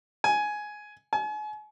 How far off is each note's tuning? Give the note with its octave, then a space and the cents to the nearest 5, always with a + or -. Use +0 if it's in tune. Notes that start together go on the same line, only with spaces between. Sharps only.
G#5 +10
G#5 +40